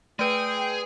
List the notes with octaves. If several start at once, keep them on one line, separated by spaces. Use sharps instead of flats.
A3 G#4 B4 G5